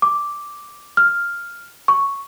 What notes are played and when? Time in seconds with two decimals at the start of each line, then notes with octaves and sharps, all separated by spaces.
0.02 D6
0.97 F6
1.88 C#6